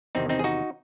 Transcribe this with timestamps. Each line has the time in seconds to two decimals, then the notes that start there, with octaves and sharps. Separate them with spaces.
0.15 E2 C3 D#3 C4 D#4
0.29 C4 D#4
0.39 G#4
0.44 D#4 F#4